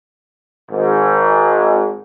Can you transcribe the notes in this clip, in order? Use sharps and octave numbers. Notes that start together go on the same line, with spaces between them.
G#1 G#2